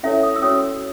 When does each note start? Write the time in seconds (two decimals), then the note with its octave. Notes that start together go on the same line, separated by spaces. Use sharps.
0.03 C#4 E4 A4 C#5 E5
0.23 D#6
0.36 E6
0.42 C#4 F#4 C#5 D#6